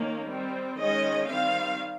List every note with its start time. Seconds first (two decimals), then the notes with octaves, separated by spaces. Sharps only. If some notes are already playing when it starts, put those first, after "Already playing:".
Already playing: D#3 A#3 C#4
0.28 G3 C4
0.78 D#3 G#3 C#4 D#5
1.29 D#3 G3 C4 F5